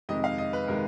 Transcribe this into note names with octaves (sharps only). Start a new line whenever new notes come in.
F2 C3 D#3 G#3 D#5
F5
D#5
B4
C3 D#3 G#3 A#4